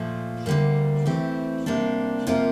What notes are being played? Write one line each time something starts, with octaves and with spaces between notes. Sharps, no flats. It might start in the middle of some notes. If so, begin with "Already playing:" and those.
Already playing: A#2 F3 A3
D2 D3 G3 A#3
E3 A3 C4 G4
C3 G3 A#3 D4
C3 F3 A#3 F4 A#4